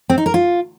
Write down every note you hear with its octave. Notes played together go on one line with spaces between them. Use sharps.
C4
D#4
A#4
F4